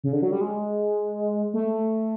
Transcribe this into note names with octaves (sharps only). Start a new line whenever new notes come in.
C#3
D3
F#3
G3
G#3
A3